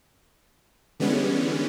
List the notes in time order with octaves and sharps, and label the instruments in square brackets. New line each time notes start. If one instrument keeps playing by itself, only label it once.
[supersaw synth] D3 E3 G3 G#3 B3 C#4